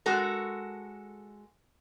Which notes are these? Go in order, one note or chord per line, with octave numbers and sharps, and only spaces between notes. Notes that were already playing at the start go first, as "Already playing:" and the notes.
G#3 F#4 A4 A#4